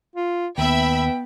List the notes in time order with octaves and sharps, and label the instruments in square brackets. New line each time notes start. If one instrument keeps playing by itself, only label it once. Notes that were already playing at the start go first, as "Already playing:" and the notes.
[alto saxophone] F4
[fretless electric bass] D#2 [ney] B3 [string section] E5 B5 E6 [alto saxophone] G5